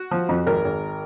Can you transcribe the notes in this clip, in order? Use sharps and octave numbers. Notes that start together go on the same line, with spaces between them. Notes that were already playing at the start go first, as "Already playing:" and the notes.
Already playing: F#4
F3
F2
G#1 A#4
G#1